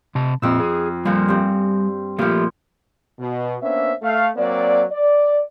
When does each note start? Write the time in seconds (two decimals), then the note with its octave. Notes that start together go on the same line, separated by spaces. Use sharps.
0.15 C3 A5
0.42 F2 A#2 C4 E6
0.60 G#4
1.05 A#2 F3 G3 G#5
1.28 G2 C4
2.19 A#2 F3 A3 G4
3.18 B2
3.62 A#3 B3 C#4 D4 C5 E5
4.02 A3 F5
4.36 F#3 A#3 C4 D5
4.91 D5